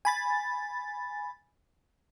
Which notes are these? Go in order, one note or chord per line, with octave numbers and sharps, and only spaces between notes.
G#5 B5 A6